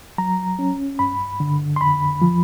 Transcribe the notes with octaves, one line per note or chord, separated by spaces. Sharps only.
F#3 A#5
C#4
G2 B5
D3
C6
F2 B5
F3